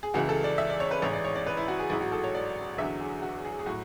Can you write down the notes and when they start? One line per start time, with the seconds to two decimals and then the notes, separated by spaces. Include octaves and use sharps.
0.03 G#4
0.14 C#2 C#3 E3 F#4
0.29 A4
0.44 D5
0.58 E5
0.70 D5
0.80 C#5
0.91 B4
1.02 A1 G#2 E3 C#5
1.13 D5
1.25 C#5
1.35 D5
1.47 B4
1.57 E4
1.68 F#4
1.79 G#4
1.90 A1 G#2 F#3 E4
2.01 F#4
2.12 A4
2.24 C#5
2.35 D5
2.78 E2 D3 F#3 E5
3.00 G#4
3.22 F#4
3.45 G#4
3.59 G#4
3.66 A2 F#3 F#4